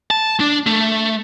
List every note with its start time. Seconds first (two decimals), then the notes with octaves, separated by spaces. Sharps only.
0.11 A5
0.40 D4
0.66 A3